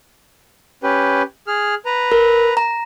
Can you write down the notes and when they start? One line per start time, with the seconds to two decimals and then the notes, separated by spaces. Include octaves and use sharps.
0.83 C#4 G4 B4
1.47 G#4 F6
1.86 B4 A#5
2.12 A#4
2.57 A#5